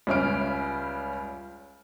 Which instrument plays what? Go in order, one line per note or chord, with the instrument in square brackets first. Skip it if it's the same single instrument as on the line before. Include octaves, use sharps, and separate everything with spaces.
[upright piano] C#2 G3 C#4 E5 F6 D7